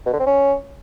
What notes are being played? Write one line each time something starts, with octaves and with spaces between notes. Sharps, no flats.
B2
D3
C4
C#4